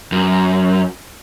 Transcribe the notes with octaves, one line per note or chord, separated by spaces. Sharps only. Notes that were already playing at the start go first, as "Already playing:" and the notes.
F#2